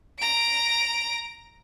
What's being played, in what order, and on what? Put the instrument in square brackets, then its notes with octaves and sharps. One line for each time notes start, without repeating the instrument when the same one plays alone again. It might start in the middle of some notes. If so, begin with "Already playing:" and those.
[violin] A#5 D7